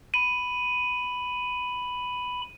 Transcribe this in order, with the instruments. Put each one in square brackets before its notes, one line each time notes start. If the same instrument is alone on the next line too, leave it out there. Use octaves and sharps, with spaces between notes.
[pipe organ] B5 [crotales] D#7